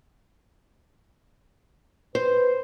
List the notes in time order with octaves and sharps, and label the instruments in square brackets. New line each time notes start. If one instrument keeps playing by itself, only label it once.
[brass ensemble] B4 [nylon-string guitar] C5